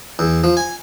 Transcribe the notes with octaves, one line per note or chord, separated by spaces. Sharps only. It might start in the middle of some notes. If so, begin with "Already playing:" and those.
E2
F3
G#5